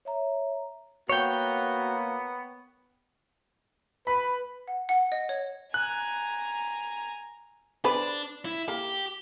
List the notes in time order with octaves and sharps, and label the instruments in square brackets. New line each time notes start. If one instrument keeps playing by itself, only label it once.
[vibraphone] C#5 E5 A#5
[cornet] A#3 [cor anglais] B3 [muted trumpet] F#4 [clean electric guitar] C#5 G5
[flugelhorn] B4 [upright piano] B5
[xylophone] F#5
F#5
D#5
C#5
[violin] G#5 A#5 [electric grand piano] F#6
[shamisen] B3 B4 C5 [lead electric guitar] D4
[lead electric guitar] E4
[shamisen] A#3 [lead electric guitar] G4